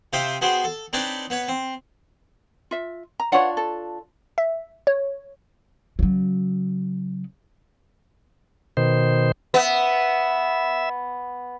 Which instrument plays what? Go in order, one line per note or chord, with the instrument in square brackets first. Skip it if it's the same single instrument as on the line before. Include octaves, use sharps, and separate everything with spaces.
[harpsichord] C3 F4 C5 E5 G5 D#6
B3 F#4 G#4 C5 G5
A4
C4 D4 D#4 B4 C#5 D5
B3 B4 C#5
C4
[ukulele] F4 E5
A#5
[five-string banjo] D4 F4 C#5 [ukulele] B4 F#5
[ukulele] A4
[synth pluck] E5
C#5
[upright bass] C#3 F#3
[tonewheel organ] B2 D#3 C5
[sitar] B3 [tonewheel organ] E5